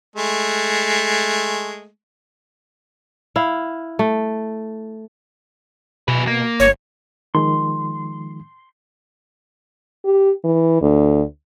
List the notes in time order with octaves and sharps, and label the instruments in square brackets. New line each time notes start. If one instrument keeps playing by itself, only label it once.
[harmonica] G#3 A3
[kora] E4 F5
A3
[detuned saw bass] B2 [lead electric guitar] G#4 B4
[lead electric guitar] A#3
[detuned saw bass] G1 [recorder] C#5
[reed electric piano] D#3 F3 G#3 [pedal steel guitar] C6
[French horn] G4
E3
D2